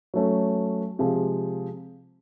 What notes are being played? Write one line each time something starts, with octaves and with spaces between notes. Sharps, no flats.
F#3 A3 C#4
C3 F3 G#3